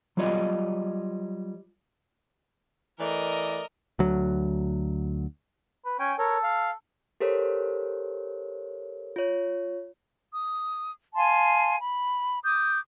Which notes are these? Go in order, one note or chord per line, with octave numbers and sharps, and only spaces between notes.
F#3 G3 F4 C#5 D#5
E3 A3 A#4 D5 D#5
D2 F#3
B4
C#4 G5 G#5
A4 A#4 C#5
F5
G4 A4 A#4 C5 C#5
F4 C#5
D#6
F5 G#5 A5 C6
B5
D6 D#6 G6